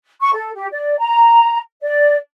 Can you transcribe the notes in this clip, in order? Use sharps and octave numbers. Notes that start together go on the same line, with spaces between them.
C#6
A4
G4
D5
A#5
D5